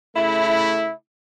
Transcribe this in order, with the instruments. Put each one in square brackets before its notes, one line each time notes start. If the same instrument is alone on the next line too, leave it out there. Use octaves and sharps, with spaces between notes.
[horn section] C#3 A3 E4